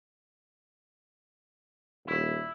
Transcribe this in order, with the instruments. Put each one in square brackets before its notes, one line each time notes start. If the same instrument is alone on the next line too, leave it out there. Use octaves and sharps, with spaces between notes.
[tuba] D#1 [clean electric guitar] E4